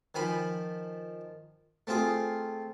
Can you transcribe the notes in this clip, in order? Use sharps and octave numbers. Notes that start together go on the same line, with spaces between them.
D#3 F3 G#5 B5
A3 C4 F4 G#4